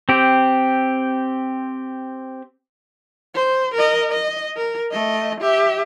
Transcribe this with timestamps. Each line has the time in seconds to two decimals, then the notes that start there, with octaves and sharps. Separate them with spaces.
0.09 C4 G4
3.35 C5
3.75 A#4 D#5
4.12 D#5
4.57 A#4
4.92 A3 D#5
5.41 G4 E5